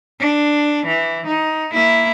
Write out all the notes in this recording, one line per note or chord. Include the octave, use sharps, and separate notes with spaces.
D4
E3
D#4
A#3 E4